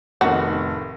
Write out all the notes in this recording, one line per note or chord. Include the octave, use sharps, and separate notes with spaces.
F1 A2 D#3 B3 F#4